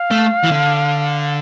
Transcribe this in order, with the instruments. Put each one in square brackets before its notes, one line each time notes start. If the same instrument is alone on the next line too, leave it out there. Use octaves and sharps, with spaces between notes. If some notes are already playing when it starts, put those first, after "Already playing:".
Already playing: [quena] F5
[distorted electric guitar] A3
E3
D3